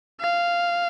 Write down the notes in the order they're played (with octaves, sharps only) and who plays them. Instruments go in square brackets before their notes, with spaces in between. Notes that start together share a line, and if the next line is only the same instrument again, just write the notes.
[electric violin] F5